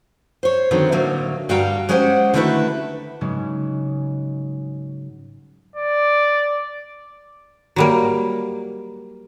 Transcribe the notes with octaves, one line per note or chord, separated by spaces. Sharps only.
C5 C#5
D3 D#3 F#3 B3 C4
A2 D3 F#3 A#3
G2 G3 F#4 F5 G5 A#5
F#3 G#3 C#4 G4 C5 F#5
D3 D#3 A3 E4 F#4 B4
G#2 C#3 F#3 G#3
D5
F#3 G3 A#3